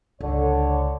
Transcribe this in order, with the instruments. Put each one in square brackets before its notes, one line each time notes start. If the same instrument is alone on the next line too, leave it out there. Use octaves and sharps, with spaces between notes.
[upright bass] C#2 [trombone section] D3 [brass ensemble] C#5